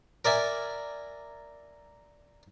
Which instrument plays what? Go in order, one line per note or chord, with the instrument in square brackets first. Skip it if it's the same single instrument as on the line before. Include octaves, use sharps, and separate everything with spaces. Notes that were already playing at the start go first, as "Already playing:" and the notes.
[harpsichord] A#4 D5 E5 G#5